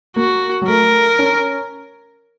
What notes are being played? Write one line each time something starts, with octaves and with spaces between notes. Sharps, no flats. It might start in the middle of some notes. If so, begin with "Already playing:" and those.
A#3 F#4
F#3
A3 A#4
C#4